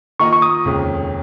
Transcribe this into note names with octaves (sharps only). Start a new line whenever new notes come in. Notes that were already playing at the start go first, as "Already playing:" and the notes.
D#3 A#3 F4 A#4 D#5 C#6
C#6
D#6
F1 D#2 C#3 G#3 C#4